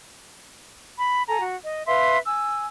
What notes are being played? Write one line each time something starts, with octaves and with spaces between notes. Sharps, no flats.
B5
A4 G#5 A#5
F#4
D#5
B4 E5 F5 C6
G#5 E6